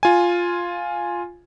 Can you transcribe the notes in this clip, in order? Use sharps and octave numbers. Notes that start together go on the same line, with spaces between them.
F4 G#5